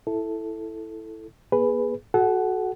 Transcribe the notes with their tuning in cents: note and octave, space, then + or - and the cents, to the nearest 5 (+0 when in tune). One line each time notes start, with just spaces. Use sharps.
E4 +0 A4 +0
A#3 +45 G#4 +0 B4 +0
F#4 +0 A4 -35 F#5 +10